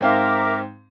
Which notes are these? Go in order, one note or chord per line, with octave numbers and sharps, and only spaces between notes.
G#2 C4 A#4 E5 F5 D6